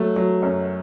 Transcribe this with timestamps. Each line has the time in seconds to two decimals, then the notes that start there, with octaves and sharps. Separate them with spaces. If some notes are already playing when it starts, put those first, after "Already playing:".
Already playing: F#3 A3
0.16 F#3
0.42 F#2